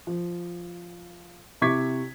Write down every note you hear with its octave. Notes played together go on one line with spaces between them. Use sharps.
F3
C3 E4 C#6 D6 G#6 B6